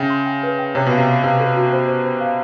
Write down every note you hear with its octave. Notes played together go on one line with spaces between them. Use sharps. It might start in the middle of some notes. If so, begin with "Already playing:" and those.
Already playing: C#3 E5 G5
C6
G5
B4
G5
C3 C#5
B2 F5
C3
F5
C3 F5
A4
F#4
C5
C5
C5
F5